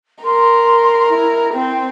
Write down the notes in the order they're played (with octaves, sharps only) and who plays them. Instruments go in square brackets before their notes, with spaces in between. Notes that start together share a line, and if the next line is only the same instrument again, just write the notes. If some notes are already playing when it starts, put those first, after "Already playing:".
[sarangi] A#4 [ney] C6
[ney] E4
[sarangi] C4